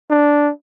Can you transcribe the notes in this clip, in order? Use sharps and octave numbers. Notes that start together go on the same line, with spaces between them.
D4